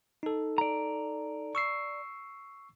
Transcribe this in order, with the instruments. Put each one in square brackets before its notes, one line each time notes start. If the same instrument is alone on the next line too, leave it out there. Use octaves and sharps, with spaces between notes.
[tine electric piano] D#4 A4
[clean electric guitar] D5 A#5
[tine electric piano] C#6 E6 C7